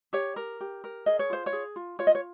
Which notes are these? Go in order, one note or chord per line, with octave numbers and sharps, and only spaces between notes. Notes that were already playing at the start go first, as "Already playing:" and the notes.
G4 C#5
A#4
G4
A#4
G#4 D#5
C#5
F4 C5
C#5
G#4
F4
F4 C#5
D#5
C#5